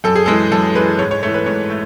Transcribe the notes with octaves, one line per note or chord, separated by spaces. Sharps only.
F#2 A4
G#4
E3 G#3 A4
F#2 A4
E3 G#3 B4
G#2 C#5
C#5
E3 A3 C#5
B4
G#2 C#5
A3